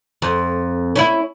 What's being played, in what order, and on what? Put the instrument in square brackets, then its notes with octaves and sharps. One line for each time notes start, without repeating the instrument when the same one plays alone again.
[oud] F2
C#4 D#4 E4